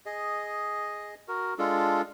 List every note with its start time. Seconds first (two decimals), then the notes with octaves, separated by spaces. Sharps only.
0.06 G#4 D#5
1.28 F#4 A#4
1.58 G#3 D4 F4 A4